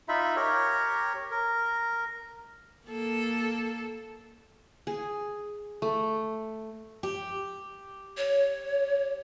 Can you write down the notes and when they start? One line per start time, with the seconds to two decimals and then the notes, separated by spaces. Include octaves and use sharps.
0.08 D#4 F4 E5 B5
0.36 G4 A#4 C#5
1.31 A#4
2.88 A#3 A4
4.87 G#4
5.82 A3
7.03 G4
8.17 C#5